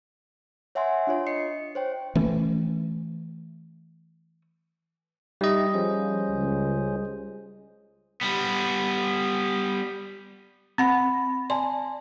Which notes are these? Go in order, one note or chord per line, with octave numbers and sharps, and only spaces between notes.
C#5 E5 F#5 G#5 C6
D4 F4 C#5
D#5 C7 C#7
C5 C#5 G5
E3 A3 C#4
G3 D#4 G4 D#5 E5
F3 C#4 G#4 C5
C#2
G3 B3
C4 F#5 B5 A#6
D5 G#5 A5 C6